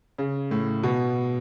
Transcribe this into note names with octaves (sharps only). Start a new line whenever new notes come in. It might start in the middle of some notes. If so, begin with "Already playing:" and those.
C#3
A2
B2